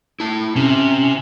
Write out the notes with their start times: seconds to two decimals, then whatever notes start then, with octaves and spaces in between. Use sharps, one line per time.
0.20 E4 A5
0.56 C3 C#4